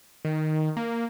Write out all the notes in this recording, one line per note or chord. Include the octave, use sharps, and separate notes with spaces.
D#3
A#3